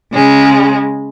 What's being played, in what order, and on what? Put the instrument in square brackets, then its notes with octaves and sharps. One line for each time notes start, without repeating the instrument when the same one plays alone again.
[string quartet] C#3 G#3